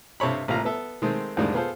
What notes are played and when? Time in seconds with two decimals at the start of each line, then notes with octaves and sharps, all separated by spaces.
0.20 G2 C3 A4 C#5 B5
0.48 A1 C3 A#3 F4 F5 A#5
0.65 B3 A4 E5
1.02 D#3 G#3 A3 C4
1.37 F2 A2 D3 D#3 G3 G#3
1.54 B3 F4 G#4 A4 C5